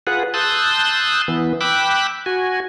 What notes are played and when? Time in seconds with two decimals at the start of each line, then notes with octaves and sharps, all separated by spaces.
0.07 F4 G#4 B4 F#5
0.34 A5 C6 D#6 E6 F#6 G6
1.28 E3 B3
1.61 G5 B5 D6 E6 F#6
2.26 F#4 G#5